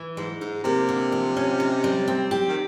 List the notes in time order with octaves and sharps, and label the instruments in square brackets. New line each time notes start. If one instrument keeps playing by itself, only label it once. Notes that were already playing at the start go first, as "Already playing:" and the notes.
Already playing: [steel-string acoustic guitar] E3
[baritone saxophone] G#2 [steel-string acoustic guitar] G#3
[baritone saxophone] G#2 [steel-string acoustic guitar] D#4
[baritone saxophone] C3 [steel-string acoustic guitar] A#3
[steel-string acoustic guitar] D3
F3
C#4
D#4
G3
C4
G4
[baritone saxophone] D#3